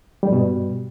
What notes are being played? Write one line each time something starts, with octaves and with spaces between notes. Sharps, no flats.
G2 B2 G3